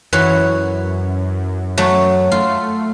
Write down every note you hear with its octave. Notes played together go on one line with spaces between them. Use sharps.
F#2 E3 F#4 C#5
F#3 A3
A3 F4